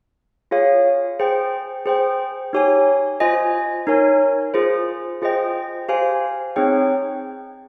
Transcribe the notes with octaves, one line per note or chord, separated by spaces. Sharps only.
F4 G#4 C#5 F5
G#4 C5 G5
G#4 C5 G5
D#4 G4 C#5 G#5
F4 C5 D#5 G#5
D#4 A#4 C#5 G#5
F4 G#4 C5
F4 G#4 C5 D#5 G5
G4 C5 F5 G#5
C4 D#4 G#4 C#5 G5